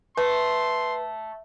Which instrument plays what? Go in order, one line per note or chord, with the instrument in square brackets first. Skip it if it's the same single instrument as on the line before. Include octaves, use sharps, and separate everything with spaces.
[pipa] A3 [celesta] B4 [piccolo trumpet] C6